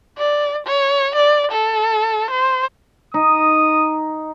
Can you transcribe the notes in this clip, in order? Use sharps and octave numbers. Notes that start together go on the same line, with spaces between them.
D5
C#5
D5
A4
C5
D#4 D#6